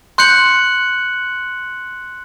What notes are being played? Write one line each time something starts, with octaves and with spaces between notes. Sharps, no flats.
C6 F#6 G6 C#7 F#7